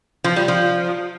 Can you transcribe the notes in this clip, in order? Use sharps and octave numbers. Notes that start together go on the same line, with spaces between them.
F3
G3
F3